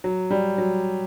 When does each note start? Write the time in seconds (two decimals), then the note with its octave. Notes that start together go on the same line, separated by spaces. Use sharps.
0.04 F#3
0.31 G3
0.58 F#3